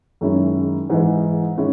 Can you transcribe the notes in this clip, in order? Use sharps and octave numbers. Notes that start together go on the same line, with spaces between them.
F#2 D#3 G#3 C#4 E4
G#2 E3 G#3 D#4
D#3 G#3 C#4 E4